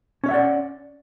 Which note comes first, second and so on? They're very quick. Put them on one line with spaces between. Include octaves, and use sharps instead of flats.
C#4 C#5 E5 F#5 D5